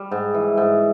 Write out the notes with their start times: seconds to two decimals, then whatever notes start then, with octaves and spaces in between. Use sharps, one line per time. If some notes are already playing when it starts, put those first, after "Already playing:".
Already playing: G3
0.11 G#2
0.34 E3
0.57 G#2